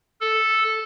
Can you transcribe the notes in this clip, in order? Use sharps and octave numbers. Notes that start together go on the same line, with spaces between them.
A4